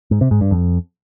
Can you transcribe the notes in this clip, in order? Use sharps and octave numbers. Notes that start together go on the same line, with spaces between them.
G#2
C3
G#2
G2
F2